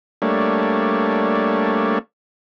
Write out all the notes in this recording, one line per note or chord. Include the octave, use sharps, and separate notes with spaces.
G3 A3 A#3 D4 C#5